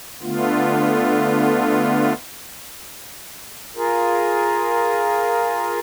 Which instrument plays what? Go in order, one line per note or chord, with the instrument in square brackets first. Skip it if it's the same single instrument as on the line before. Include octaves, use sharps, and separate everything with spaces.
[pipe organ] D3 A3 B3 F4
[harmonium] F4 G#4 A#4